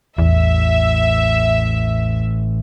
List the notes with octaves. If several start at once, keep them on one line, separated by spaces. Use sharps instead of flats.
A1 E2 E5